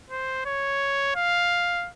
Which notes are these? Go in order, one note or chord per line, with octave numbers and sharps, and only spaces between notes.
C5
C#5
F5